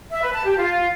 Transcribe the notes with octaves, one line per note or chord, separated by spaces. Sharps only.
E5
B4
A5
G4
F4